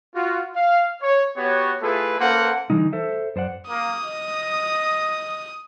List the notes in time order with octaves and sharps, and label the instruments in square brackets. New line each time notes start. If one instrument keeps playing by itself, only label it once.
[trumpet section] F4 F#4
F5
C#5
B3 F#4 G4 C#5
A3 E4 F4 G#4 A4 B4
A#3 C#4 A4 B4 C5 F#5
[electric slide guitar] D3 E3 G3 D#4
A4 C5 E5
F#2 C5 D5 F#5
[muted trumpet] A#3 [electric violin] D#6
[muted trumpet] D#5